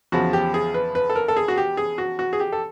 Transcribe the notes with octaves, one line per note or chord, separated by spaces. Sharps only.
E2 C#3 F3 F#4
G4
G#4
B4
B4
A4
A#4
A4
G#4
F#4
G4
G#4
F#4
F#4
G#4
G4
A4